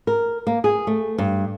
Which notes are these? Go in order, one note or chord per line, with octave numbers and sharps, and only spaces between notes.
A#4
A#3
G#4
A3
G2